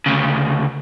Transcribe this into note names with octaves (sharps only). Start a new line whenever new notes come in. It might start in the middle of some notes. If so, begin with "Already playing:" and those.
D2 C#3